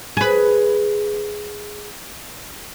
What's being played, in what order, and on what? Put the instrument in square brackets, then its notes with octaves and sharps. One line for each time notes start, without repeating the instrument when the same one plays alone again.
[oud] G#4 B4